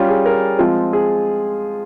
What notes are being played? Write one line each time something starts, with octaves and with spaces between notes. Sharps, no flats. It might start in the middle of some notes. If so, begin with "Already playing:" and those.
Already playing: G3 C#4 F4
G#4
A#4
F3 G#3 C4 F4
G#4